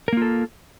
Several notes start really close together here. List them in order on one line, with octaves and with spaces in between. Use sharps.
A#4 A#3 F4 A4